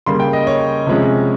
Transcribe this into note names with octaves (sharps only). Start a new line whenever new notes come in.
C#3 G3 A#3 C6
G5
D#5
C#5
C3 F3 G#3 C#4